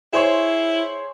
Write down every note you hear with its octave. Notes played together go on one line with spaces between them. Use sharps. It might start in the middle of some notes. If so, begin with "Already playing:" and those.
E4 G#4 C5 C#5